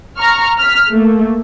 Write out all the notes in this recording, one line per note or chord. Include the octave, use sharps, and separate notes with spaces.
A#5 C#6 F6
F6 B6
A3 A#3